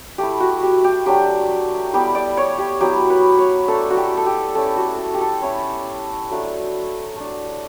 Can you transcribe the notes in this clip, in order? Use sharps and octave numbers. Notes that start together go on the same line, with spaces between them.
A3 E4 G4
F#4
G4
G4
F#3 A3 D4 G4
G3 B3 E4 G4
D5
C#5
G4
F#3 B3 E4 G4
B4
C#5
A3 D4 A4
F#4
G4
A4
G4
A3 C#4 E4 A4
F#4
A4
G4
A4
A3 C#4 E4 C#5
F#3 A3 D4
A3 D4